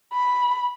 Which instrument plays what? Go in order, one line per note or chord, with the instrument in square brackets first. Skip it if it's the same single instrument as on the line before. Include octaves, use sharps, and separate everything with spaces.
[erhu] B5